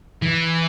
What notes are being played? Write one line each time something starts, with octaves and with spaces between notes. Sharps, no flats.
E3